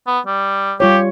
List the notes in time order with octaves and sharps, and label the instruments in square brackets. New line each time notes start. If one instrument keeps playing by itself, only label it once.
[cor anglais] B3
G3
[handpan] G3 F4 C#5 [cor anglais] G4